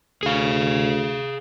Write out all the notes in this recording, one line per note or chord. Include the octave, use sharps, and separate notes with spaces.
D2 G#4 F5